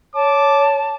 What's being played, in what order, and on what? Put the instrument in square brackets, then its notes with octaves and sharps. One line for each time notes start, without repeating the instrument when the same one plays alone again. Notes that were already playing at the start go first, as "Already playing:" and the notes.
[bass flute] C#5 [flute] A5 [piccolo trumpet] D6